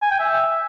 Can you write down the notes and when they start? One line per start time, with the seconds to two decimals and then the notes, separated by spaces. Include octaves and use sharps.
0.02 G#5
0.11 G5
0.20 E5